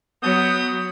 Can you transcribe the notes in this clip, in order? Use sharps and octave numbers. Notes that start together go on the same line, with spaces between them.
F#3 B3 D#6 G6